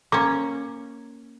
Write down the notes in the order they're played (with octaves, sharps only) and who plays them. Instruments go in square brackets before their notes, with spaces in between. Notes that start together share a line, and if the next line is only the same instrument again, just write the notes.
[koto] A#3 C#4 [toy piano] D6